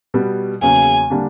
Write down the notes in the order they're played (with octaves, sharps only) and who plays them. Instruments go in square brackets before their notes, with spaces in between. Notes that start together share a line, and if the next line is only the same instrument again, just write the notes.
[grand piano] B2 G3 B3
[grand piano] E2 C#3 F#3 A#3 C#4 [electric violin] G#5
[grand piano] D3 G3 A#3 D4